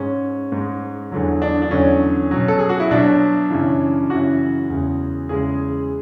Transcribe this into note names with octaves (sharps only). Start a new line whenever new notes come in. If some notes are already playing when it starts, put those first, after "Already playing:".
Already playing: G#2 G#3 C#4
G#2 G#3
E2 D3 F#3
D4
D4
E2 D3 F#3 C#4
B2 F#3
A4
G#4
F#4
E4
B2 F#3 D4
F#2 C#3 E3
F#2 C#3 E3 F#4
E2 C#3 G#3
E2 C#3 G#3 G#4